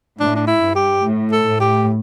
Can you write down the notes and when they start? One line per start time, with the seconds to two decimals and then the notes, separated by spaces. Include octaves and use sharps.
0.20 A2 D4
0.36 D4
0.47 E4
0.61 G2
0.76 G4
1.04 A2
1.32 A4
1.46 A2
1.60 G4